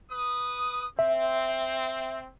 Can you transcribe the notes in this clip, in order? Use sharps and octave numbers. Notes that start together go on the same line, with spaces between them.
B4 D#6
C4 E5